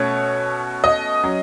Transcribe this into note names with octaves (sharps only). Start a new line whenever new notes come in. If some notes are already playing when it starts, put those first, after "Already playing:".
Already playing: B2 A3 C#4 C#5
D#5
F#3 C#4